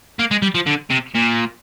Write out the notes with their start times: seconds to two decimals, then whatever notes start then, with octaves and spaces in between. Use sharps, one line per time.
0.19 A#3
0.31 G#3
0.42 G3
0.55 F3
0.67 D3
0.90 C3
1.15 A#2